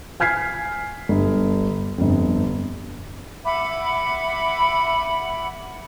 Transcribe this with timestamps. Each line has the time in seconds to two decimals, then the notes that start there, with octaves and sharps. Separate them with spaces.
0.20 G#5 F6 G#6 B6 C7
1.09 G1
1.98 G1 F2
3.44 E5 F#5 B5 D6